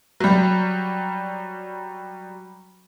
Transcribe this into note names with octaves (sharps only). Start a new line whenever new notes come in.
F#3 G3